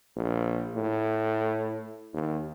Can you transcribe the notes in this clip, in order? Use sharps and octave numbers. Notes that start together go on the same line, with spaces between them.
A#1
A2
D#2